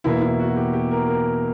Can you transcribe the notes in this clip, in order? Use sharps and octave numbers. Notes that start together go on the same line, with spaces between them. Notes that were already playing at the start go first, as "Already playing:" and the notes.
E2 B2 A#3 E4
E4
F#4
G4
G4
A#4
A#4